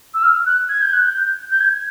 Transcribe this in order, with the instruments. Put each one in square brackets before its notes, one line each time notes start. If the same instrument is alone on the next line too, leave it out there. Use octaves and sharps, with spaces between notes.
[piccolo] E6
F6
F#6
G#6
G6
F#6
G6
G6
G#6